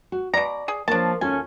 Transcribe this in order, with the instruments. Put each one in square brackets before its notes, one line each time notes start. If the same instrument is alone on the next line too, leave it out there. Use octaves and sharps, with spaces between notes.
[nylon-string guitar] F#4
[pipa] B2 A#5 [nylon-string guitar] D5
[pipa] G#4
[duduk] F3 [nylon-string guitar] A#3 C#5 [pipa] D4 A5
[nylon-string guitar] D#2 F4 A4 [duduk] C#4 [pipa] G#5